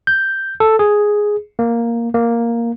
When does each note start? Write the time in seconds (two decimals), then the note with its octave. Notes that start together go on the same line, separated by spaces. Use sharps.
0.07 G6
0.60 A4
0.79 G#4
1.59 A#3
2.14 A#3